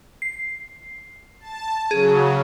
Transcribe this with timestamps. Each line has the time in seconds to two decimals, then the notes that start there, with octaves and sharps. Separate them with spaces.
0.22 C7
1.40 A5
1.91 C#3 F#3 G#4